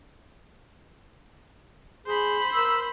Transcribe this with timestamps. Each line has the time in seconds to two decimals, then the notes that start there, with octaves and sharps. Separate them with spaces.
2.06 G#4 C5 B5
2.53 A#4 E6